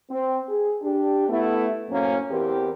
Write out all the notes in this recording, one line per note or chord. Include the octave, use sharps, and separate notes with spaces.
C4
G#4
D4 G4
A3 B3 E4
F#2 A2 A#3 C4 C#4
E2 E3 C4 G4 A#4 B4